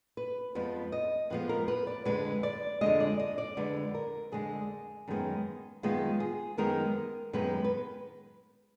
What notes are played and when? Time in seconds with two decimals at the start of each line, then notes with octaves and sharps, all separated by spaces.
0.17 B4
0.55 F2 F3 G#3 B3 B4
0.92 D#5
1.30 F2 F3 G#3 B3 B4
1.49 A#4
1.68 B4
1.87 D5
2.05 F2 D3 G#3 B4
2.43 D5
2.81 F2 D3 G#3 D#5
3.00 D5
3.19 D#5
3.38 D5
3.57 F2 D3 G#3 B4
3.94 A#4
4.32 F2 D3 G#3 G#4
5.08 F#2 D#3 G#3 B3
5.83 F#2 D#3 G#3 B3 F4
6.20 G#4
6.58 F#2 D#3 G#3 B3 A#4
7.33 F#2 D#3 G#3 B3 B4
7.64 B4